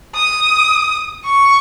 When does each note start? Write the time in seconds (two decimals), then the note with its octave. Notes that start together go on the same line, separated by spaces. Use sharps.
0.16 D#6
1.25 C#6